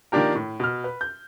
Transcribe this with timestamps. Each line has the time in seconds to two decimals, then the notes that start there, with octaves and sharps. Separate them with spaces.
0.12 D#3 F3 A#3 D4 G4 A#4
0.35 A2
0.60 B2 F6
0.84 B4
1.01 G6